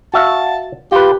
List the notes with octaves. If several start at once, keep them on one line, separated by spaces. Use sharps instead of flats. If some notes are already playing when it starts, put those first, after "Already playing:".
F#4 E5 F5 A5
F4 G4 B4